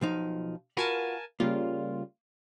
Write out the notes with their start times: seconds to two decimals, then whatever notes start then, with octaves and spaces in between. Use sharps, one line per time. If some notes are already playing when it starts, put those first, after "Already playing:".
0.01 B1 F3 D#4
0.77 F4 F#4 A#4 B4 G#5 A5
1.40 C#3 G3 A#3 F4